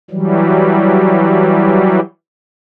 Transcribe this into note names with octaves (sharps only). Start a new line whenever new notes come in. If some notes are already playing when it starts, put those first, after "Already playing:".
E3 F#3 G3